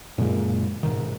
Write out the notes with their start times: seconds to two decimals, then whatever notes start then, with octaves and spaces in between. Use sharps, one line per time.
0.18 F#2 A#2 C#3 G#3
0.83 G#2 B2 D#3